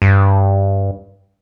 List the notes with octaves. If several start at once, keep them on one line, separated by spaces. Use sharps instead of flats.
G2